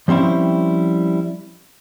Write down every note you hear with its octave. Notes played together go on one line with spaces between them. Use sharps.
F3 G3 C4 C#4 E4